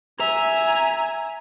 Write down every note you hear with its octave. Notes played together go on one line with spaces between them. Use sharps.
E5 G#5 A#5